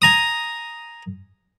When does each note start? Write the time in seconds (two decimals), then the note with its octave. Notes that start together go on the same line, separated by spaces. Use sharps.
0.02 G#5 A#5 D#6